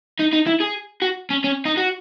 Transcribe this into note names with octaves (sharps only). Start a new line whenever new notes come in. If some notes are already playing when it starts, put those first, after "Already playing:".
D#4
D#4
E4
G#4
F#4
C#4
C#4
D#4
F#4